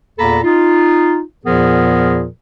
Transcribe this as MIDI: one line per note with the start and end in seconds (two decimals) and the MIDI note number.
0.18 0.39 40
0.18 0.39 46
0.18 0.39 58
0.18 0.39 69
0.18 0.39 82
0.18 0.39 83
0.44 1.21 63
0.44 1.21 65
1.46 2.25 40
1.46 2.25 46
1.46 2.25 53
1.46 2.25 59
1.46 2.25 68
1.46 2.25 70